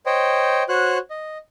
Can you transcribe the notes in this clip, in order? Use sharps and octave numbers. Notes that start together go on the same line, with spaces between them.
C5 C#5 D#5 G5
F#4 C5 C#5 F#6
D#5